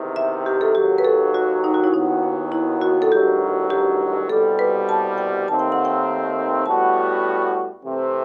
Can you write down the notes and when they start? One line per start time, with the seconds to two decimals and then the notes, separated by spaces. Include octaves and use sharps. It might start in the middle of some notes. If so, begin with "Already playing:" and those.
Already playing: E2 C3 D#3
0.16 E5
0.46 G4
0.61 A4
0.75 D#2 D#3 F#3 G4
0.98 B4
1.05 A4
1.34 F#4
1.64 D#4
1.74 F#4
1.84 E4
1.93 D#2 D#3 F#3 B3 D#4
2.52 E4
2.81 F#4
3.02 A4
3.11 A1 G2 D#3 F#3 G4
3.70 G4
4.29 C2 B2 G3 A4
4.59 B4
4.89 A5
5.18 G5
5.48 D#2 D#3 A3 C4 A5
5.59 G5
5.72 F#5
5.85 G5
6.65 A2 G3 B3 F#4 A5
7.83 C3 E3 A3 C4